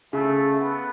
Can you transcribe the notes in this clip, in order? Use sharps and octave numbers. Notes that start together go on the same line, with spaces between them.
C#3 A3
B3